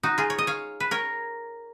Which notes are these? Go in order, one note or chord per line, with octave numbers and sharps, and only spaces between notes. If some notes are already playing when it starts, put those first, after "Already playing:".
D#4 F#4
F4 G#4
C#5
D#5
C#5 F5
B4
A#4 C#5